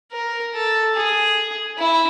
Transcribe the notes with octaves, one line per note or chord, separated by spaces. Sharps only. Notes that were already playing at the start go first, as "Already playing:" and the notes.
A#4
A4
G#4
E4